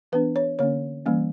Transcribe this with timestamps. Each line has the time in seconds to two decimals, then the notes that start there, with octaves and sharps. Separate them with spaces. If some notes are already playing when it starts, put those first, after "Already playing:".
0.12 E3 B3 D4 B4
0.36 C#5
0.59 D3 A#3 C#4 C#5
1.06 E3 G3 A#3 C#4